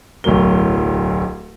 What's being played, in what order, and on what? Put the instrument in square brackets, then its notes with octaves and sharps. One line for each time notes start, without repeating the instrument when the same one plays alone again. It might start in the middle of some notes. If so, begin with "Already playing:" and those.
[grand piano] D1 B1 A2 F#3 A#4 G7